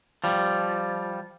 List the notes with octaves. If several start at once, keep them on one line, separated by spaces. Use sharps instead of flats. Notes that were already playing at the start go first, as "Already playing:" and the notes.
F3 G3